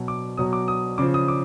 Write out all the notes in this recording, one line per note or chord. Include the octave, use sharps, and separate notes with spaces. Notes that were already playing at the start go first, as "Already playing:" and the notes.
Already playing: B2 F#3
D6
B2 F#3 D#6
D6
D#6
C#3 F3 D6
D#6
D6